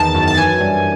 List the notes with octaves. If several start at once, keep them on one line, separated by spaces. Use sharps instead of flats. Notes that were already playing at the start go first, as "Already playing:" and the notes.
Already playing: E2 D#3 A5
F#2
A5
E3 G#5
G2